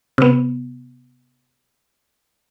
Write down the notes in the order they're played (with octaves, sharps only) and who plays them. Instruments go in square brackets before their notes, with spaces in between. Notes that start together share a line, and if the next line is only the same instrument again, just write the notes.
[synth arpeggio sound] C3 B3